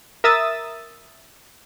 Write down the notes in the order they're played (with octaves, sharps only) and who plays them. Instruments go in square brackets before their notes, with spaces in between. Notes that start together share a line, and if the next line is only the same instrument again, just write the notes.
[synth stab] A#4 E5 D#6 E6 A6